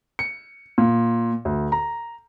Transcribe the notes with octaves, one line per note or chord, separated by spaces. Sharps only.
C#7
A#2
D2
A#5